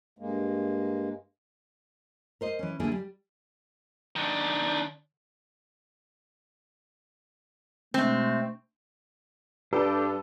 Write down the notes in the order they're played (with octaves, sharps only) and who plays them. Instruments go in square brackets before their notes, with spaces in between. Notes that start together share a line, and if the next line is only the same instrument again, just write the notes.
[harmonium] G2 G#3 A#3
[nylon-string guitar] A#4 C5 D#5
E3 C#4
D3 G3 A#3 E4 G#4
G3
[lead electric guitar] D#3 D4
[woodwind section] B2 G#3 A3 [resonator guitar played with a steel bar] C4
[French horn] G2 [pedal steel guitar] D4 G4 [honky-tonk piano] A4 B4